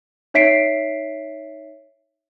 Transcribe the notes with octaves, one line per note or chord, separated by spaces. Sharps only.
D#4 C#5 E5 B6 C7 D7